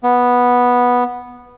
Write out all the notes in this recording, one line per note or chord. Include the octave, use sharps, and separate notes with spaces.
B3